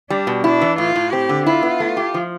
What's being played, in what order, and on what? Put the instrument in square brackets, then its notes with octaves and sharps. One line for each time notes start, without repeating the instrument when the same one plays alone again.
[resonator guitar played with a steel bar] G3 [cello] D4
[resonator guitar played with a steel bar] B2
[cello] D4 [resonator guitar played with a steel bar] E4
[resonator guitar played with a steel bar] E3
[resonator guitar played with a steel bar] A2 [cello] F4
[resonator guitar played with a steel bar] A2
[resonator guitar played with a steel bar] C4 [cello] G4
[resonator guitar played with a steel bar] D3
[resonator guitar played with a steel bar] E4 [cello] F4
[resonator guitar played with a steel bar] B3
A3
G4
F3